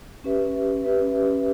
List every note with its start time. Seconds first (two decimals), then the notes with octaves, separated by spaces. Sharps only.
0.24 C#4 G4 B4 E5
0.84 C#4 G4 B4 E5